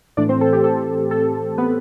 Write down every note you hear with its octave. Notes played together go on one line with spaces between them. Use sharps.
A2 E3 A3 D4 D5
C4 C5
A4
G4
A4
A4
B3 B4